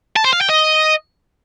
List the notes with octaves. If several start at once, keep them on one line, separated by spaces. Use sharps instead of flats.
A5
C5
F5
G5
D#5